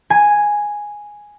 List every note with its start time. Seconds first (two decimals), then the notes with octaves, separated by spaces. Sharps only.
0.10 G#5